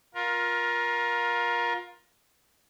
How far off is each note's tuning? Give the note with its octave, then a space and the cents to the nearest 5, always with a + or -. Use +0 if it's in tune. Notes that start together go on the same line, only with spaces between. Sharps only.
F4 +15 A#4 +25